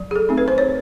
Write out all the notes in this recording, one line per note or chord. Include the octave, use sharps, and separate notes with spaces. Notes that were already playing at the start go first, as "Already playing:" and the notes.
Already playing: F#3
G#4
A4
A3 C4 D#4
B4
C5
C#5